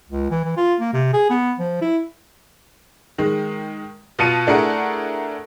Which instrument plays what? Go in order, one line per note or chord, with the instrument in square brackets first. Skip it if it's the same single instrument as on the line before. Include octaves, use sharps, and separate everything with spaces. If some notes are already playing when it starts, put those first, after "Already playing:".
[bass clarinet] C#2
E3
E3
F4
A#3
C3
G#4
B3
F3
E4
[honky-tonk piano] D#3 G#3
B2 F4 A5 C#7 D#7
A3 D4 E4 G#4 A#4 F#5